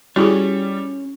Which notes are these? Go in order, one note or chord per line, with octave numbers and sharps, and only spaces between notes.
G3 C#4 E4 F#4 G#4 C#5